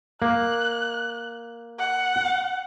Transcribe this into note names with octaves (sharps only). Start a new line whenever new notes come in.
A#3 F#6
F#5